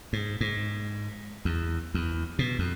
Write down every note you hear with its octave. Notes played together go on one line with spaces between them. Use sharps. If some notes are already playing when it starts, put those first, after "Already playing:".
G#2
G#2
E2
E2
B2
F2